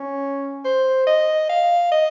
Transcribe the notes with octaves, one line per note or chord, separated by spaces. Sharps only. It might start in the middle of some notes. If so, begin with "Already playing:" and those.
Already playing: C#4
C5
D#5
F5
D#5